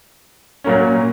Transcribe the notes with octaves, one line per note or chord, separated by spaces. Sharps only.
A#2 F#3 A#3 C#4